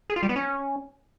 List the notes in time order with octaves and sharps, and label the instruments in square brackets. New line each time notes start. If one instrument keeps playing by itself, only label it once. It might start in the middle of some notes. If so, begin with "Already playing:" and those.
[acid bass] G#4
F4
G3
B3
C#4